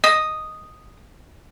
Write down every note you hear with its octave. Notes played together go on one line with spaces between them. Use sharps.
D#5 D#6